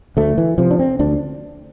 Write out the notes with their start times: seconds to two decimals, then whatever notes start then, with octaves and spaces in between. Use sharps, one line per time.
0.17 D2 A3
0.38 E3
0.58 C3 F3
0.71 D4
0.79 C4
0.99 D2 D4